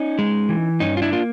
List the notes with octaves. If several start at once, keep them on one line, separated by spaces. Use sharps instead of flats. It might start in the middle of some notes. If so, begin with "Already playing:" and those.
Already playing: C#4 D#4
G#3
E3
G2 C#4 D#4
F4
D4 E4
A#3 F4